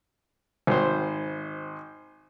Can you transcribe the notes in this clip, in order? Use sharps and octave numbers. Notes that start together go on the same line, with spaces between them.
G#1 C5